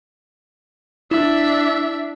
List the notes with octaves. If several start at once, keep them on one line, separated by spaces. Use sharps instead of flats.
D4 E4 E5